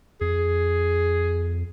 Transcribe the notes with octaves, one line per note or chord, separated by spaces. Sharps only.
F2 G#4